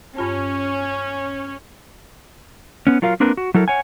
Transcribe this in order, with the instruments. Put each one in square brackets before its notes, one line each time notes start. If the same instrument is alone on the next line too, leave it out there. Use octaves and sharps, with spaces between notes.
[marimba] G2 F4 A5 [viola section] C#4
[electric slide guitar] B3 C#4
F#3 F4 A#4 F5
A#3 C4 D4 A#4 B4
F#4
F#3 E4 A4 A#4
C#5 F#5 G#5